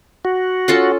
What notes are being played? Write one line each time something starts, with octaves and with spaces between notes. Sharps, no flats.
F#4
C#4 F4 A4